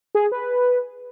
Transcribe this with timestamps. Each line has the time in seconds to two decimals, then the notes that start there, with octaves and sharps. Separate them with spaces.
0.15 G#4
0.32 B4